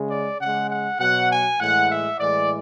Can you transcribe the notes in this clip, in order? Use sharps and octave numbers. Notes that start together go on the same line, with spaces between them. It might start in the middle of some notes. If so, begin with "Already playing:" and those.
Already playing: C#3 G#3
D5
C#3 G#3 F#5
F#5
B2 F#3 F#5
G#5
A2 E3 G#3 F#5
E5
A2 E3 G#3 D5